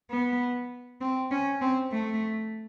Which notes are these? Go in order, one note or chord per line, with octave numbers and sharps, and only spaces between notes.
B3
C4
C#4
C4
A3